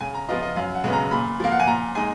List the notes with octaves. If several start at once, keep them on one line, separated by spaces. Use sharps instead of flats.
C#3 G#5
A#5
F3 B3 F4 D#5
D#5
F#2 F5
F#5
C#3 G#3 B3
A#5
A#2 B5
F3 A#3 F5
F#5
G#5
A#2 A#5
G#3 D#4 G#5